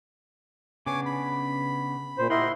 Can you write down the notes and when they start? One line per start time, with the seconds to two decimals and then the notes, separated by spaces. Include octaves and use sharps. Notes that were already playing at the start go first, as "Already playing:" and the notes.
0.86 C#3 B3 D4 C#5 G#5 D6
1.06 B5
2.19 A#2 C5
2.30 E4 G4 A#4 D#5 F#5 G5 C6